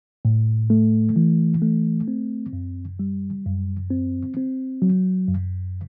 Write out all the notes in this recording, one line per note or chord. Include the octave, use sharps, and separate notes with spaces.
A2
A3
E3
A3
C4
F#2
G3
F#2
C4
C4
F#3
F#2